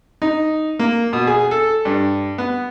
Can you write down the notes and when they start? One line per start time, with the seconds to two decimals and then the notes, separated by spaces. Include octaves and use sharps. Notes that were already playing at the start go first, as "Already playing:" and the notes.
0.22 D#4
0.79 A#3
1.13 B2
1.27 G#4
1.51 A4
1.85 G2
2.38 B3